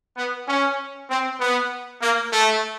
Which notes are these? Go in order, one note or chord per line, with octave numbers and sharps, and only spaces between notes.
B3
C#4
C4
B3
A#3
A3